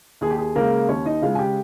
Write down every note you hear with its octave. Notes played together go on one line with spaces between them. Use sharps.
D#2 G#4
G4
G#4
C#3 G#3 A#3 A#4
D#2 C#4 C#5
D#4 D#5
C#3 G#3 F4 F5
G#5
G4 G5